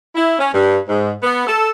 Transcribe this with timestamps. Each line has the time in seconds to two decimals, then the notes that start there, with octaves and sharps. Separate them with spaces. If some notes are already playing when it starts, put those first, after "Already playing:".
0.15 E4
0.39 C#4
0.53 G2
0.88 G#2
1.23 B3
1.47 A4